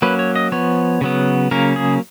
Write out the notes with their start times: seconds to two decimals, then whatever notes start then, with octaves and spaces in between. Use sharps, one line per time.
0.02 F#3 A#3 C#4 B4
0.19 C#5
0.36 D#5
0.52 F3 B3 C#5
1.01 C#3 F#3 B3
1.51 C#3 F#3 A#3 C#4 A#4
1.76 G#4